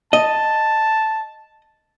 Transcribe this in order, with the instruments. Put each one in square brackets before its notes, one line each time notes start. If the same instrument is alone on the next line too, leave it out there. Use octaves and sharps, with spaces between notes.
[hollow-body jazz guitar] D#5 [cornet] A5